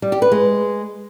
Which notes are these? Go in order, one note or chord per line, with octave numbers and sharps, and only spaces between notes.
G3
G4
B4
G#3